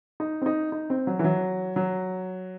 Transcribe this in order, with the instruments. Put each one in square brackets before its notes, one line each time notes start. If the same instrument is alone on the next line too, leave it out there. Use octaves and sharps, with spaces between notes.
[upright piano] D#4
C4
D#4
D#4
C4
F#3
E3
F#3
F#3